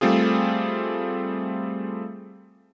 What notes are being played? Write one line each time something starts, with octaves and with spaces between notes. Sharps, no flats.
G3 A3 C4 F4 G#4